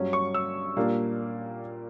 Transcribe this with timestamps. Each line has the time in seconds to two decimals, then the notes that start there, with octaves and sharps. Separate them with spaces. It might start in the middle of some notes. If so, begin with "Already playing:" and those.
Already playing: G2 F#3 C#4
0.13 C#6
0.34 E6
0.76 A#2 G3 A#3 D4